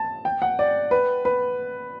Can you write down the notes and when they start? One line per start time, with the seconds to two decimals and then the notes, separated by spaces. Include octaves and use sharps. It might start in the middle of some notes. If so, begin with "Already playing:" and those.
Already playing: A5
0.25 G5
0.42 F#5
0.59 D5
0.91 B4
1.25 B4